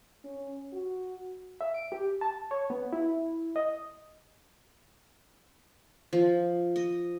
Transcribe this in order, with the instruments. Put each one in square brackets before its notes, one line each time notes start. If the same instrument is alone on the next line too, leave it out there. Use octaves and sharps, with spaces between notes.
[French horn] C#4
F#4
[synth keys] E5
D7
G4
A5
C#5
B3
E4
D#5
[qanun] F3
D#5